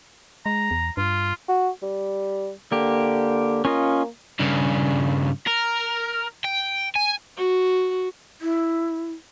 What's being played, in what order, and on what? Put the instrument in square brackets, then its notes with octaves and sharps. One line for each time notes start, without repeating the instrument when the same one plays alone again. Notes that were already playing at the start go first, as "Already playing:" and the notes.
[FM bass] G#3 [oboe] A#5
[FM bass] E2
[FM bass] G2 [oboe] F4
[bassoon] F#4
G3
[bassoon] D3 [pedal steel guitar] A#3 G4
[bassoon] A#3 [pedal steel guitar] C#4 F4 D#5
[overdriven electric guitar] G2 C#3
A#4
G5
G#5
[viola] F#4
[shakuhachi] E4